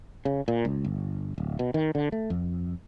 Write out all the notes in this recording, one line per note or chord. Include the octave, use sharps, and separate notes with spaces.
C#3
A#2
C#2
G1
D1
B2
D#3
D3
A3
F2